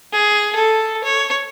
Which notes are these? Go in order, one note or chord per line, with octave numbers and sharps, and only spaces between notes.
G#4
A4
C#5